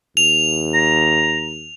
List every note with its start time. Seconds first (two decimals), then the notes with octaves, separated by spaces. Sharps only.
0.17 D#2 F7
0.74 A#5